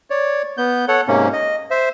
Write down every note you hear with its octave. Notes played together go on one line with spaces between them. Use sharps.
C#5 D5
B3 G6
A4 C#5 F#5
G#2 C3 A#3 C#4
D#5
C5 E5